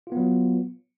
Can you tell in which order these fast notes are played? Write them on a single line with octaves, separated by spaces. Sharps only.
F4 B3 F#3